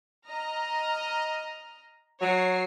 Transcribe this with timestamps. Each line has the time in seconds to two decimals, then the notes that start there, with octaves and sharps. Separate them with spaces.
0.27 D#5 A#5 F6
2.21 F#3 C#5 C7